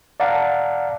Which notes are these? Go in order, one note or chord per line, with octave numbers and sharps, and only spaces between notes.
D5 F5 F#5 A5 A#5